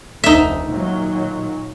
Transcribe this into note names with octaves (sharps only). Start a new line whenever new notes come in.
F1 D2 D#4 E5
A#2 D#3 F#3